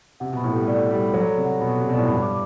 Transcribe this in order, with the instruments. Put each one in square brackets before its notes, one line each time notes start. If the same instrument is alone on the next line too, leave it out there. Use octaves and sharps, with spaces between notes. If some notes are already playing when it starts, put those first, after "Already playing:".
[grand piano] C3 [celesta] F#5
[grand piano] B2
[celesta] B5
[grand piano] A2
[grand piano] G3 [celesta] A4
[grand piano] A3 [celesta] D5
[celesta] F#5
[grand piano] G3
[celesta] B5
[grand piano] F#3 [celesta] A4
[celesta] D5
[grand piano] C3
[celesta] F#5
[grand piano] B2 [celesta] B5
[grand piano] C3 [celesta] A4
[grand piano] B2 [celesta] D5
[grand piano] A2
[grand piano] G2 [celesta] B5
[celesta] D6